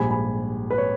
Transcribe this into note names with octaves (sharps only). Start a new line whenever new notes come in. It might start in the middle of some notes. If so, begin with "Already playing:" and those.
Already playing: A#1 G#2 G3 G#5 B5
G#5 B5
B4
C#5